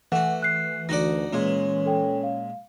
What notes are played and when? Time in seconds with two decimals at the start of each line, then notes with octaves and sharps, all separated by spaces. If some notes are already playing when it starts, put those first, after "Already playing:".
0.12 E3 A3 F#4 F#5
0.42 F#6 C7
0.89 D2 D#4 F#4 D5 A#6
1.33 A#2 G#3 C#4
1.86 A4 G5
2.23 F5